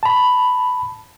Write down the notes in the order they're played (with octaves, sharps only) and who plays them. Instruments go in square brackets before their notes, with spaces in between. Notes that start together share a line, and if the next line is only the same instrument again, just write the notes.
[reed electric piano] A5 B5